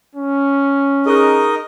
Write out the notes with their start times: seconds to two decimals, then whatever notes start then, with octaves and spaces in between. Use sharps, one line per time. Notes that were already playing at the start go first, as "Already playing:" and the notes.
0.15 C#4
1.06 D#4 G#4 A#4 D#5 C#6 F#6